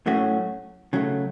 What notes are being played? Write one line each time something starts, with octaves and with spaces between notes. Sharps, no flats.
A2 F#3 A3 C#4 F#4
C#3 F#3 A3